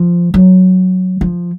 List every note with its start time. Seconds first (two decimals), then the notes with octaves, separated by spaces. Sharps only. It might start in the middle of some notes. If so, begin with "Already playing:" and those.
Already playing: F3
0.34 F#3
1.21 F3